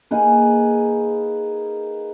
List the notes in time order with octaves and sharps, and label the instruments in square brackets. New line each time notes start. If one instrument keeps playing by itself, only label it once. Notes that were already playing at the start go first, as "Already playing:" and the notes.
[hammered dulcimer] A#3 D#4 G#4 B4